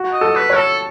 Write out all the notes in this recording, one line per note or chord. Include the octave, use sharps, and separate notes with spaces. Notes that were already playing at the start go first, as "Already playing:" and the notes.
Already playing: F#4
D#5
A4
B4
C#5
A4